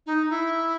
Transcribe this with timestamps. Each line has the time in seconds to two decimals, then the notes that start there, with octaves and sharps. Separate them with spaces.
0.06 D#4
0.30 E4